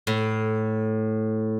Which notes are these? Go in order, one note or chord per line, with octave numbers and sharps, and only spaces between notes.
A2